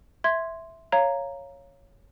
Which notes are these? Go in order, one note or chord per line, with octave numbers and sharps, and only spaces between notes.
E5 C6 G#6
C#5 F5 A#5